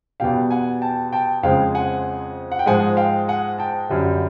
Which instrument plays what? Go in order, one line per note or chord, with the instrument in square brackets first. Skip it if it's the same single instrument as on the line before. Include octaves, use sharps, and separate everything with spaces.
[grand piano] E2 B2 G3 F5 G5
F#5 G#5
G5 A5
G5 A5
F2 C#3 F3 G#3 F5 G5
F#5 G#5
F#5
G5
G#2 F3 G#3 F#5 G#5
F5 G5
F#5 G#5
G5 A5
F#2 D3 G3